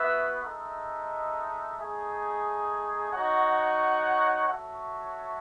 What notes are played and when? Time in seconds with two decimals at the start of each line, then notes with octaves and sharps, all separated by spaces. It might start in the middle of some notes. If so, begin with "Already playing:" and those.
Already playing: B3 F#4 B4 E5
0.42 G#3 D#4 A4 E5
1.77 A3 D#4 G#4
3.12 D#4 F#4 C#5 F#5
4.47 F#4 A4 C#5 E5